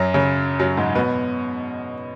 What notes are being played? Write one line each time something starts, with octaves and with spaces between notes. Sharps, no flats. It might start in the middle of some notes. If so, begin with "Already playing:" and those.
Already playing: F#2 F#3
C#3
F#2 F#3
G#2 G#3
B2 B3